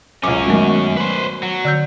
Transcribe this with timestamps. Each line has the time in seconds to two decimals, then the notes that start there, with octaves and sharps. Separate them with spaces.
0.23 C#2 F#2 C#4 D6
0.46 B2 D#3 F#3 G#3 A3
0.97 B4 C5
1.43 F#3
1.65 D3 E6 G6